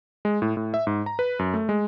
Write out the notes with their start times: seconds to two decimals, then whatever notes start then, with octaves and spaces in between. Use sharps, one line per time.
0.25 G#3
0.42 A2
0.57 A2
0.74 E5
0.87 G#2
1.06 A#5
1.19 B4
1.39 F#2
1.54 A3
1.69 G#3